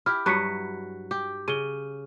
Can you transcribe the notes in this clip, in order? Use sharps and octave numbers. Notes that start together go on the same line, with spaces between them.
E4 G4 F6
G2 F#3 B4 F#6 B6 C#7
G4
C#3 D#7 G7